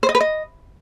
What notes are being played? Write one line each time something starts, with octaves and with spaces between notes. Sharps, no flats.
C5
D#5
B4
D#5